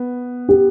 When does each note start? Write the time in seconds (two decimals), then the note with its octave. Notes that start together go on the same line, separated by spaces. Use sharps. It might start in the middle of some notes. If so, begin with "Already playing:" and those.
Already playing: B3
0.49 G4